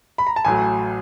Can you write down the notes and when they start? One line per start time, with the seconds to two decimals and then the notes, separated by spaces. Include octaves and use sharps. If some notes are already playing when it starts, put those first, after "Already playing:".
0.18 B5
0.27 A#5
0.36 A5
0.45 A1 A2 F#3 G#5